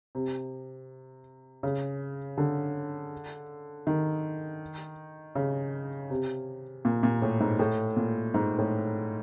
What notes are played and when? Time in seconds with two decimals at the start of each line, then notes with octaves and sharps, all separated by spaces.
0.15 C3
1.63 C#3
2.38 D3
3.87 D#3
5.35 C#3
6.10 C3
6.85 A#2
7.03 A#2
7.22 A2
7.40 G#2
7.59 A2
7.97 A#2
8.34 G#2
8.59 A2